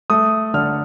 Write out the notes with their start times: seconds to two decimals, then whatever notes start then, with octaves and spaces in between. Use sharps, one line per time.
0.10 A3 D#6
0.54 D3 F6